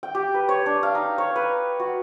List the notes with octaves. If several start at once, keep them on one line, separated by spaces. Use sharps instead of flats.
G5
G4
B4
C#5
D4
F5
D#4
C#5
B4
F#4